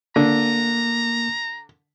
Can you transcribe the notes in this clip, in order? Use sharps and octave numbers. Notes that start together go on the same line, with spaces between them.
D3 A#3 A#5